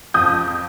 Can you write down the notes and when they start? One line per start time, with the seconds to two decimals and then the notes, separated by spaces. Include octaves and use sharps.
0.14 F2 D#6 G6